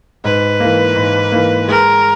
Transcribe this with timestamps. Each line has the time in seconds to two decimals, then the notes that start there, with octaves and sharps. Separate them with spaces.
0.24 G#2 B4
0.60 E3 A#3
0.96 G#2
1.32 E3 A#3
1.68 G#3 A#4